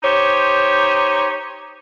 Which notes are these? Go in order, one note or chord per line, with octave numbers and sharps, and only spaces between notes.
D#4 G4 C5 C#5